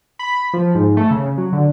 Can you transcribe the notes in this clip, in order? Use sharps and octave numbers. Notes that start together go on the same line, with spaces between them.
B5
F3
G#2
A3
C#3
F#3
D3